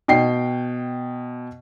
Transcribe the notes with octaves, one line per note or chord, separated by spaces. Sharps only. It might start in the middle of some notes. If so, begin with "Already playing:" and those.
B2 G5 C7